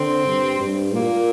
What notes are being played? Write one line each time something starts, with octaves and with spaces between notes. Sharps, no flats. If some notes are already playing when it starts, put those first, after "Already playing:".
Already playing: D3 C4
G2
G2
A#2 A#3